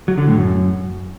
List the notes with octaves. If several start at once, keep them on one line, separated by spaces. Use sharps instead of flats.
F#3
D3
A2
F#2